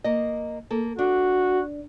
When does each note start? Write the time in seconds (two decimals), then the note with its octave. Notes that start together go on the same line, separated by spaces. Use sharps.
0.04 A#3 D#5
0.71 A#3 A4
0.99 D4 F#4